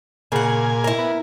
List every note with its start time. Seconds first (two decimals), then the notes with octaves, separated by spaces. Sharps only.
0.32 A#2 C#3 F#5 G#5
0.84 E4 A#4
0.99 B3